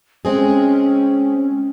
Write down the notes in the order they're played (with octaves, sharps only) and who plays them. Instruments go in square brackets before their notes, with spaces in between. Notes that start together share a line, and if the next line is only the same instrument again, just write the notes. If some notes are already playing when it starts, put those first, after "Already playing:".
[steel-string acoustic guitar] G#3 C4 G#4 [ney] C#4